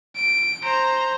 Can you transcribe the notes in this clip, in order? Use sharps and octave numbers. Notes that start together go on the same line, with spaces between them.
D7
C5 A#5